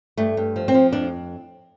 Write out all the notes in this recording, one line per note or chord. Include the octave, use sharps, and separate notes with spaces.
G2 A3
G2
F3
C4
F3
F2 D4